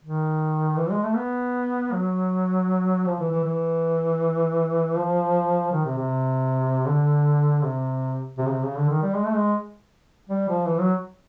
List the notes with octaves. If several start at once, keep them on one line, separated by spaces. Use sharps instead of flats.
D#3
E3
G#3
A3
B3
F#3
F3
E3
E3
E3
F3
D#3
C3
C3
D3
C3
C3
C#3
C3
C#3
D3
D#3
G3
G#3
A3
G#3
G3
F3
E3
F#3